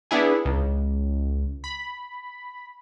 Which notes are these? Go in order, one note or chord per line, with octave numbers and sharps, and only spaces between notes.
B3 D4 E4 G#4
C#2
B5